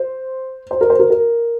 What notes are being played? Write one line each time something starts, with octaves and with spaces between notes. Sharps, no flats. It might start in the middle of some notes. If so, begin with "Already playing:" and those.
Already playing: C5
C5
A#4
C5
A#4
A#4